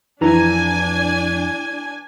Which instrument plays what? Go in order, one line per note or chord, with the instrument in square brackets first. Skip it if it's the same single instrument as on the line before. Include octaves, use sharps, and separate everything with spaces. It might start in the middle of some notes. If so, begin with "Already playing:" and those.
[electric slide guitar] F2 A#5 [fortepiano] E3 [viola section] D4 G#5